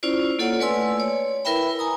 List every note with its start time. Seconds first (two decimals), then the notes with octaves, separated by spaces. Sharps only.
0.03 C#4 E4 F4 C5 D5
0.39 A#3 F4 A4 C#5 D5 F#5
0.60 A3 B4 D5 G#5 C6 E6
1.00 C#5
1.45 E4 A#4 B4 E5 G5 B5
1.79 G#5 A#5 D#6